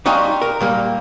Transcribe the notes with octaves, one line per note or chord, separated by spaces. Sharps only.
G3 D#4 F#4 F5 G#5 C6
A#4
A#2 G3 A#3